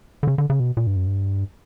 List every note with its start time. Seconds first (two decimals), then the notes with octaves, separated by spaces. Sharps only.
0.23 D3
0.27 C#3
0.38 D3
0.50 C#3
0.60 B2
0.77 A#2
0.87 G2
0.96 F#2
1.07 G2